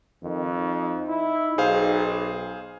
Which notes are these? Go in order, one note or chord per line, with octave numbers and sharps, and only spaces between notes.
F2 D#3
D#4
E4
B1 G#4 C5 F5